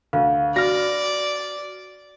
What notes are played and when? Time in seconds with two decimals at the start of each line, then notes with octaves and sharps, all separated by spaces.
0.13 D2 F5
0.56 F#4 D5 F6 A#6